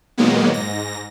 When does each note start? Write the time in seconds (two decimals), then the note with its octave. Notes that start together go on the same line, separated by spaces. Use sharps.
0.18 A#2 D#3 F#3 G#3 A#3 B3
0.54 G#2 A#6